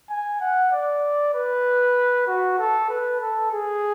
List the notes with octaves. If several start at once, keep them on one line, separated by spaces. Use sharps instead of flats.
G#5
F#5
D5
B4
F#4
A4
B4
A4
G#4